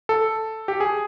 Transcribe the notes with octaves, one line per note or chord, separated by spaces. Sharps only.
A4
G4
G#4